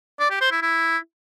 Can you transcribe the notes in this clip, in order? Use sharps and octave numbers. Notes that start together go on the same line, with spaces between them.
D5
G4
C5
E4
E4